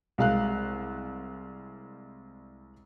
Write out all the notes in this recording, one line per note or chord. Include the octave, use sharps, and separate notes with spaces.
C2 G#3 F5 F#6